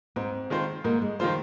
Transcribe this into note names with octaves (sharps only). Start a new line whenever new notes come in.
G#2 C4
D#3 G#3 F4 C5
G#2 A#3
G#3
D#3 F3 G#3 F4 C5